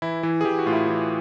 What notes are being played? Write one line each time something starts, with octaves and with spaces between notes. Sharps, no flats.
E3 E4
E3
G#4
E3 G4
F#4
A2 F4
E4
E3